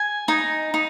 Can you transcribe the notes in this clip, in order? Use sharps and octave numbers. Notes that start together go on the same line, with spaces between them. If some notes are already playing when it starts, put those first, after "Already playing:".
Already playing: G#5
D#4
D#4